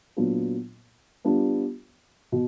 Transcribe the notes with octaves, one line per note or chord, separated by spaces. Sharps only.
A#2 F#3 B3 D4 F4
G3 B3 D4 F4
B2